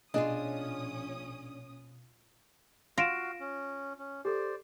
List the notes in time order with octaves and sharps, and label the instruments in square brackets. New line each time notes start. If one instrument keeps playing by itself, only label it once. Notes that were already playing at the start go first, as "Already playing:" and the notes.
[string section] A#1 C#4 D#6 [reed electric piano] B2 [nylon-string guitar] D4 G#4 [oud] F4 D#5
[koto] F4 [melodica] F#4 F5 [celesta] A#6 D7 E7
[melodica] C#4
C#4
[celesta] G4 A4 [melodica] C5 D5